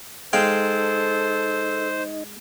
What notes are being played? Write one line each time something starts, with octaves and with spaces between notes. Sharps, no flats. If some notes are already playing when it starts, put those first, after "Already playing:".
G#3 D#4 A4 C5 D#5 F5 G5